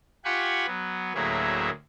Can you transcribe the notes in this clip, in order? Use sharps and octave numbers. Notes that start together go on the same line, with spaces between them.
F4 G4 F#5 G#5 B5 C#6
F#3 B3
D2 A2 F#3 A#3 G#4 E5